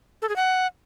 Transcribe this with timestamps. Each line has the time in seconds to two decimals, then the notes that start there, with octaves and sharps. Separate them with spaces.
0.22 A4
0.29 G#4
0.36 F#5